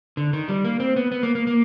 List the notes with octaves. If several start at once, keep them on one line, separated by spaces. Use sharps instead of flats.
D3
D#3
G3
A#3
C4
B3
B3
A#3
A#3
A#3